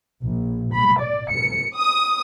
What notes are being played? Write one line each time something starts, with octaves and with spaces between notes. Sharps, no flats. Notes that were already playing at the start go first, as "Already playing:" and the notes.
A#1
B5
D5
C#7
D#6